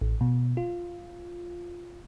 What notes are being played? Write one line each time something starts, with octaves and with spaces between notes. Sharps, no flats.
A1
B2
F4